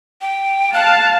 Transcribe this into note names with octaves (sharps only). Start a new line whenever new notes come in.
G5
F5 A5 F#6